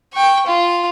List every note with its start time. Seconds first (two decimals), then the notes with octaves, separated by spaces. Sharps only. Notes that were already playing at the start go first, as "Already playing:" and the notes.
0.13 G5 C#6
0.47 F4